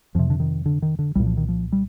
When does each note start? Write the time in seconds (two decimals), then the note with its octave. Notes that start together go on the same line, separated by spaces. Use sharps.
0.15 F2 C3 F3
0.30 D3
0.40 D#3
0.66 D3
0.82 D#3
0.99 D3
1.15 C2 A#2 G3
1.26 F3
1.37 D#3
1.49 F3
1.72 G3